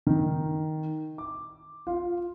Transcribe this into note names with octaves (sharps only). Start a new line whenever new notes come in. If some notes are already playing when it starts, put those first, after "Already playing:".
D#3
D6
F4